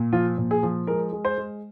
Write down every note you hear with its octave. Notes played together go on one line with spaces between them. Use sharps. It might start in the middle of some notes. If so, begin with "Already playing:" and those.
Already playing: A#2
F3 F4
A#2
G#4
F3
G#3 A#4
G#3
C5
G#3